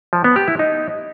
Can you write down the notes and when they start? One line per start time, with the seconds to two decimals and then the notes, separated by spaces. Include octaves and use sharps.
0.13 F3
0.24 B3
0.36 G4
0.48 E4
0.59 D#4